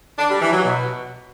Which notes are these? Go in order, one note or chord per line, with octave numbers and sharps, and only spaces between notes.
D4
G3
E3
F#3
B2